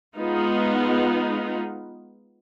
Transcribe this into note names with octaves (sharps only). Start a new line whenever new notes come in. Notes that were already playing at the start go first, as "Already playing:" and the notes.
G#3 B3 D#4 F4